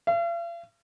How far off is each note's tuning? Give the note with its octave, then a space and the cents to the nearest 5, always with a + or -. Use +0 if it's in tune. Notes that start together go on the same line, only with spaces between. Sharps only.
F5 -45